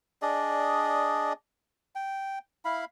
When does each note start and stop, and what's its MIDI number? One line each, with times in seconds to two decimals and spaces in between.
0.22 1.33 62
0.22 1.33 68
0.22 1.33 74
0.22 1.33 75
1.95 2.39 79
2.65 2.85 64
2.65 2.85 77
2.65 2.85 83